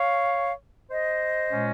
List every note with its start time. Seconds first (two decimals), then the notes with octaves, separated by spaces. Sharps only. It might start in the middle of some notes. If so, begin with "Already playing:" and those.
Already playing: C#5 F5
0.91 C5 D#5
1.49 A#2 G#3 C#4